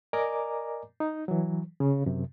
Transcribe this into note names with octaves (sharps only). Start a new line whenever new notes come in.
A#4 D5 D#5 G#5 A#5 D6
D#4
E3 F#3
C#3
F#2 C3